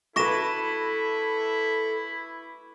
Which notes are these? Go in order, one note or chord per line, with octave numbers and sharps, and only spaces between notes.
E4 A4 B4 C#6 D6 A#6 E7